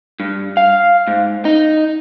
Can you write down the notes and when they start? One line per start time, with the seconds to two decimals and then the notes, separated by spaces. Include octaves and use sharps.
0.20 G2
0.57 F5
1.07 G#2
1.45 D#4